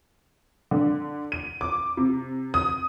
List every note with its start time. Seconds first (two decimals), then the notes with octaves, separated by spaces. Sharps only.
0.71 D3
1.32 D#7
1.61 D6
1.97 C3
2.54 D#6